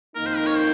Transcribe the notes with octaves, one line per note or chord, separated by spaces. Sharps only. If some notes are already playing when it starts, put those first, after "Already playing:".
F2 D#3 A#3 D#4 A#4
C5
A#4
C#5
C5